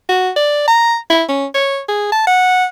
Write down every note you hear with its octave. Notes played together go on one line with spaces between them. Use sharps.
F#4
D5
A#5
E4
C#4
C#5
G#4
A5
F#5